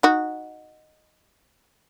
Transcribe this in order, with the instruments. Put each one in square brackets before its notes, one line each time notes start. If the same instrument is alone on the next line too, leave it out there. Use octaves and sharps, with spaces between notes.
[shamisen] D#4 F#4